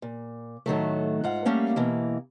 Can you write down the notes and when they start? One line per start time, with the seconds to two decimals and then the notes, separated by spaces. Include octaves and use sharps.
0.02 A#2
0.66 A2 D#3 F#3 A3
1.24 G#2 F4 F#5
1.45 G3 A3 A#3 C#4 F5
1.76 B2 E3 A#3